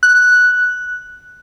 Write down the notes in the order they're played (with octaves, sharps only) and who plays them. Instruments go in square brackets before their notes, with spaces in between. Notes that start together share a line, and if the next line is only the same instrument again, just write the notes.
[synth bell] F#6